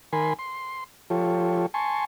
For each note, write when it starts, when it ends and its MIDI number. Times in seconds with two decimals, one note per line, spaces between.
0.13 0.33 51
0.13 0.33 70
0.13 0.33 80
0.13 0.33 83
0.13 0.33 84
0.39 0.84 84
1.10 1.66 53
1.10 1.66 65
1.10 1.66 67
1.10 1.66 69
1.10 1.66 73
1.74 2.05 80
1.74 2.05 81
1.74 2.05 84
1.74 2.05 85